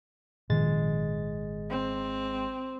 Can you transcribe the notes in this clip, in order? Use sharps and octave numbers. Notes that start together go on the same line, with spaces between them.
G#1 A#2 D#3 F3 G#3 A6
C4